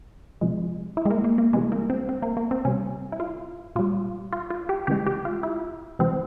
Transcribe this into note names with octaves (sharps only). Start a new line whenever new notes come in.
C3 F3 G#3
E4
G#3
A#3
A#3
A#3
C3 E3 G3 G#3
A#3
C4
C4
A#3
A#3
C4
C3 G3 C#4
E4
F4
A#2 G3 F4
F4
F4
G4
C#3 E3 G#3 G4
G4
F4
E4
C3 E3 G#3 C4